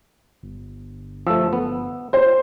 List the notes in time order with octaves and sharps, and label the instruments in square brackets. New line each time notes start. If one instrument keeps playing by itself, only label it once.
[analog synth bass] G1
[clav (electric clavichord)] F3 A3 [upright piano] E6
[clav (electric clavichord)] B3
[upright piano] C5